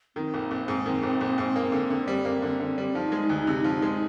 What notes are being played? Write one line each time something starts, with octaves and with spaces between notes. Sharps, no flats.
D#3 C4
A#1
A#1
G#2
D#3
A#1
A#1
G#2
A#3
D3
D3
G3
A#3
D3
D3
G3
F3 D#4
G#3
D2
C3
F3
G#3